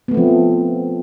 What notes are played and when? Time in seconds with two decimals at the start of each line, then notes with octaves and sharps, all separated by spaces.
0.08 B3
0.11 A3
0.14 C4
0.17 F3